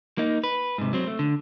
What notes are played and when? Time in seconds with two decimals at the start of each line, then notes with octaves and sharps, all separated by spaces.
0.18 A#3 D#4
0.44 B4
0.78 G#2 C3
0.93 F#3 C4
1.07 A3
1.19 D3